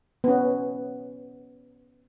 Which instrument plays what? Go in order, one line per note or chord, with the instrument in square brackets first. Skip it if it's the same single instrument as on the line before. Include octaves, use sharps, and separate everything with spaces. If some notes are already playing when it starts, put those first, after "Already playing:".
[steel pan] B3 C#4